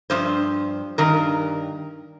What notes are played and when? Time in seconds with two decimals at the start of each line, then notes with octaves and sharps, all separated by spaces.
0.10 G2 F3 C5
0.98 G2 D#3 A#4